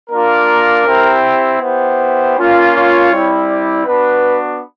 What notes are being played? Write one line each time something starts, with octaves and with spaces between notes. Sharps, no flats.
A#3 D4 F4 A#4
C4 E4 G4
B3 E4 G4 C5
A#3 C#4 F4
C#5
G3 C4 E4
D5
B3 D4 F#4 B4